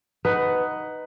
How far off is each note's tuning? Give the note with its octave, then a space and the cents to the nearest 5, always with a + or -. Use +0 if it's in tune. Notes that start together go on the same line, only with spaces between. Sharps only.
D#4 +0 B4 +10 F#5 +10